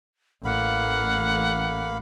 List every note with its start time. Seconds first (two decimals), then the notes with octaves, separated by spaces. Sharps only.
0.45 A1 A#3 F5 F#5 B5